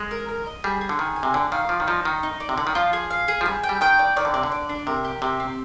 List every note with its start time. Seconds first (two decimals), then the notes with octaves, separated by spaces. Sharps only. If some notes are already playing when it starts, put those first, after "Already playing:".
Already playing: G#3
0.11 A#4
0.29 A#4
0.46 D#5
0.64 G3 G#4
0.81 G#4
0.89 D3
0.99 D#3 G#4
1.16 G#5
1.23 C3
1.34 D3 D5
1.52 D#3 F5
1.69 F3 D5
1.80 D#3
1.87 F3 D#4
2.05 D#3 D#4
2.23 D#4
2.40 D5
2.49 C3
2.58 D3 D5
2.67 D#3
2.75 F3 F4
2.93 G#4
3.10 F5
3.28 G#4
3.41 F3
3.46 G3 G#4
3.63 G5
3.69 G3
3.81 D#3 G5
3.99 D5
4.17 D#3 D5
4.25 D3
4.34 C3 D5
4.43 D3
4.52 D5
4.69 D4
4.87 C3 A#4
5.05 G4
5.22 C3 G4
5.40 C4